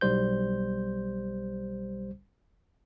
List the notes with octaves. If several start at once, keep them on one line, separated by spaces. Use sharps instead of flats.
B1 G3 C5 G6